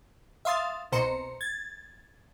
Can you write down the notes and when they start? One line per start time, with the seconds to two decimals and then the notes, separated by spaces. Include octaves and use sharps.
0.45 E5 F5 C6 D#6 A6
0.92 C2 B2 C5 A#5 C6 C#7
1.41 G#6 A6